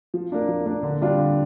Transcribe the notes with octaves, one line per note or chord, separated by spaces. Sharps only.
F3
A#3 D4
F3
A#3 D4
D3
G3 D4 F4
D3